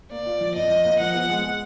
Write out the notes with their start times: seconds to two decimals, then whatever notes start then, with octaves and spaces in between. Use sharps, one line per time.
0.11 A#3 D5
0.26 F4
0.41 F3
0.55 F2 D#5
0.70 F3
0.85 A#3
1.00 F3 F#5
1.15 B3
1.29 G#3
1.44 G#3